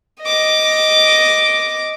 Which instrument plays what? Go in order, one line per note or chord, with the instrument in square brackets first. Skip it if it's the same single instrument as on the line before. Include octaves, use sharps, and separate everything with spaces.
[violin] D#5 D6